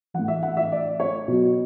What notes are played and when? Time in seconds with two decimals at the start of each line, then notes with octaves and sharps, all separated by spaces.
0.14 E3 F#5
0.19 A2
0.28 E5
0.43 F#5
0.57 E5
0.72 D5
1.00 C#5
1.28 B2 F#3